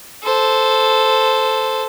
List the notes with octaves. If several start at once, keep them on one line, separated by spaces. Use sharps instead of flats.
A4 C5